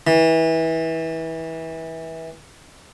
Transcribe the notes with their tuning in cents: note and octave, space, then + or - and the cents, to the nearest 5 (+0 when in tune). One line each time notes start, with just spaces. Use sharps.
E3 -25